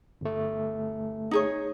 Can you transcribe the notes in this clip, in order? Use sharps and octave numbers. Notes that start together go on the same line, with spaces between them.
G1 A3
D#4 G#4 C#5